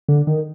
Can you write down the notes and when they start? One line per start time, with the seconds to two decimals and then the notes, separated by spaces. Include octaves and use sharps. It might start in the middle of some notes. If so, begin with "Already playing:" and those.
0.08 D3
0.27 D#3